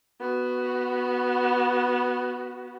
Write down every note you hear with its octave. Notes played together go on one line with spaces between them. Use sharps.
B3 F#4